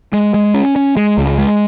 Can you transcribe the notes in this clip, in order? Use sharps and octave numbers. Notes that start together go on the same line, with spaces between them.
G#3
G#3
C#4
C#4
G#3
C#2
G#3